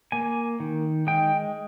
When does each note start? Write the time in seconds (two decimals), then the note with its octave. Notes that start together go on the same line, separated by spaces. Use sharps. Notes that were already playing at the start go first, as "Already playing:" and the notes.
0.12 A#3 G#5
0.60 D#3
1.07 G#3 G5